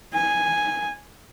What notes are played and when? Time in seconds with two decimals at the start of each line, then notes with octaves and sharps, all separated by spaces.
0.14 G#5